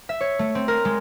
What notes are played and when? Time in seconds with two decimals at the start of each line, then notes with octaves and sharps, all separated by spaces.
0.09 E5
0.21 C#5
0.39 A3
0.55 C4
0.68 A#4
0.85 G#3